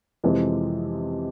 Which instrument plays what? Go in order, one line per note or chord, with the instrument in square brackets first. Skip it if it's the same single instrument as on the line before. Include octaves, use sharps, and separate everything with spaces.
[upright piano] F2 C3 E3 G#3